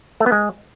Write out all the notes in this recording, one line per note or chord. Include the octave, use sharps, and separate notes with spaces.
A3
B3
G#3